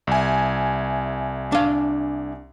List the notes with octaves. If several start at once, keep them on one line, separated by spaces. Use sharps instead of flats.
C2 E5 G#5
D4 F5